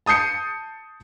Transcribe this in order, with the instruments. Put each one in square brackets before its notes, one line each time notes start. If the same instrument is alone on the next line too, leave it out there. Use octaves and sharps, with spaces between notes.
[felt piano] A5 D#6 G6 C7 C#7